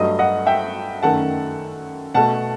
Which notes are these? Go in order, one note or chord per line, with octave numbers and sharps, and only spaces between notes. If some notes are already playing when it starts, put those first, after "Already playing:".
Already playing: G2 F#3 A3 D#5
D#5 F#5
E5 G5
F#2 D#3 A3 F#5 A5
B2 A3 F#5 A5